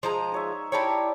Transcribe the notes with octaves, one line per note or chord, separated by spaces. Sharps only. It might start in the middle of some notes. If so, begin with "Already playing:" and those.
F3 G#3 A#5
D#4 C#5 E5
E4 G4 C#5 D5 A5 A#5